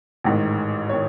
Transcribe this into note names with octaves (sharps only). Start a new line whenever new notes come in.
A1 G#2 D#3
C#5
D#3